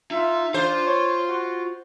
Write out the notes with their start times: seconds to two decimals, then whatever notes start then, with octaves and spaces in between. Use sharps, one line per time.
0.11 D#4 F4 E5
0.54 D4 F4 C5 F5 C6
0.86 C#5
1.28 F#4